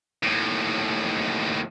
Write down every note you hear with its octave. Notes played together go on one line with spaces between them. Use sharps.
D#2 A2